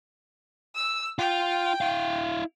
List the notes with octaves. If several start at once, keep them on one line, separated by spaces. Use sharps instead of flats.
E6
F4 G5
E4 F5